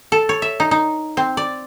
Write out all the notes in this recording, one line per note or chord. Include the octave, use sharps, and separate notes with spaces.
A4
C#5
E5
D#4
D#4
C4
D5